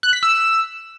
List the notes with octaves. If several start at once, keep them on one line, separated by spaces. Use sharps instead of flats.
F#6
B6
E6